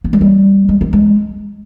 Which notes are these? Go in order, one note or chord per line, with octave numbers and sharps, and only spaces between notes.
B3
G#3
G3
G#3
B3
G#3